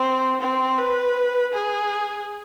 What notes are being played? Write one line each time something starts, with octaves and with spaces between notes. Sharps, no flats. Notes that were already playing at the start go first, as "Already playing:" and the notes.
Already playing: C4
C4
B4
G#4